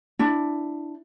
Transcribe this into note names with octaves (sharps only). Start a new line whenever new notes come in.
D4 E4